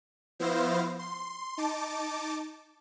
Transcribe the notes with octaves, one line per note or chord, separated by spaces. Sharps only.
F3 B3 E4 C5 F5 A#6
C6
D#4 A5 D6